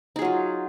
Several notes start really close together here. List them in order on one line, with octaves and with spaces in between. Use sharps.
D#4 G#4 F#3 F4